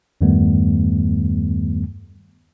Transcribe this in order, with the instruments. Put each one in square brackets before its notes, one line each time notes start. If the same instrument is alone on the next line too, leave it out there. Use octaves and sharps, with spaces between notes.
[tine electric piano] E2 G2 D#3 G3 A3 B3